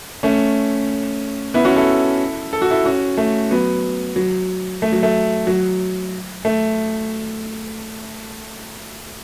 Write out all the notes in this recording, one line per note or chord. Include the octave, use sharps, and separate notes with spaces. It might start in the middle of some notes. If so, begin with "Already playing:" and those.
A3 C#4
B3 E4
C#4 F#4
E4 A4
A4
F#4
E4 A4
C#4 F#4
A3
F#3 B3
F#3
A3
F#3
A3
F#3
A3